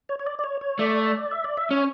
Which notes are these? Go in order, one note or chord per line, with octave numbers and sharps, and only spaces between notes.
C#5
C#5
D5
D5
C#5
C#5
A3 D5
E5
D5
E5
C#4 C#5